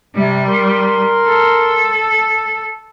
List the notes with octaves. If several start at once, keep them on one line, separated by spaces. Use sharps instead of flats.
C3 G3
A#4 C6
A4